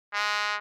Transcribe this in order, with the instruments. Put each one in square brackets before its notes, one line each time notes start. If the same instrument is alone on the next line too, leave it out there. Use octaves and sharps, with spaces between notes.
[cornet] G#3